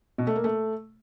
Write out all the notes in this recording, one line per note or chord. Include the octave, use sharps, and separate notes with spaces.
B2
A3
A#3
A3